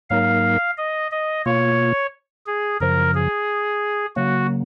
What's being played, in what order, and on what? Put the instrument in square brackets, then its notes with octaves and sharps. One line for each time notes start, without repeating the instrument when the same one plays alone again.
[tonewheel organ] G#2 F#3 A#3 D#4 A#4 [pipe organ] F5
[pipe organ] D#5
D#5
[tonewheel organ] B2 A#3 F4 [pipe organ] C#5
[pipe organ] G#4
[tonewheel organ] F#2 C#3 F3 [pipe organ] A#4
[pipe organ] G#4
[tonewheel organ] C#3 F#3 A#3 [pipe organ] F#4